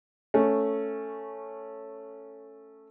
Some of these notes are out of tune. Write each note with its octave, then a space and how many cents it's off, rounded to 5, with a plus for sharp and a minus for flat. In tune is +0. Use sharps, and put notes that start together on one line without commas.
A3 +0 C#4 +0